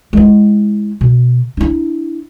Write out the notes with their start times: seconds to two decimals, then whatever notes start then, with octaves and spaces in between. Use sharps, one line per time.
0.13 G#3 E4
1.01 B2
1.57 D4 E4